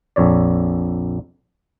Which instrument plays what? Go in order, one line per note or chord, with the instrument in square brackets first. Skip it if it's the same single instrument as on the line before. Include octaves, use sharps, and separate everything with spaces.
[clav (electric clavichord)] A#1 F2 C#5 D5